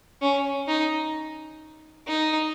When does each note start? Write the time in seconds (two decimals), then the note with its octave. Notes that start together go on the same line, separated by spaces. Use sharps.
0.21 C#4
0.68 D#4
2.07 D#4